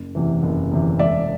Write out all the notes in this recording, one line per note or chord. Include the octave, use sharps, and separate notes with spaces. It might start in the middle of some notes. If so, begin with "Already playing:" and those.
Already playing: F#1
E2 C3 E3
F#1
E2 C3 E3
E1 D5 E5